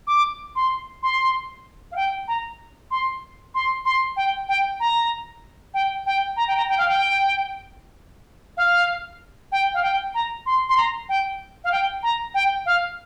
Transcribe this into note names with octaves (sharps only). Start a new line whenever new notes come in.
D6
C6
C6
F5
G5
A#5
C6
C6
C6
G5
G5
A#5
G5
G5
A#5
G5
A#5
G5
F5
G5
F5
G5
F5
G5
A#5
C6
C6
A#5
G5
F5
G5
A#5
G5
F5